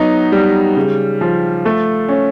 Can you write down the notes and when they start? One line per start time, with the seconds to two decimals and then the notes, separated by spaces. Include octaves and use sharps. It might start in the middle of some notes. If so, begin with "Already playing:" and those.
Already playing: F#3 B3 D#4
0.32 G3
0.76 C#3
1.21 F3
1.65 A3
2.09 C#4